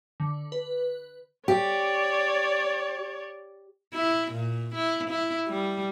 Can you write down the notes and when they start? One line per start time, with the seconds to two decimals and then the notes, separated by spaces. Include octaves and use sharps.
0.20 D3
0.52 B4
1.48 G4 C#5 D5
3.95 E4
4.32 A#2
4.74 E4
5.10 E4
5.47 G3